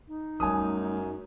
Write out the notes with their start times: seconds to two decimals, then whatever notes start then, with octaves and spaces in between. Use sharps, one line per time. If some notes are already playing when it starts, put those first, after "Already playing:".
0.08 D#4
0.40 F#2 G3 A3 G#5 D#6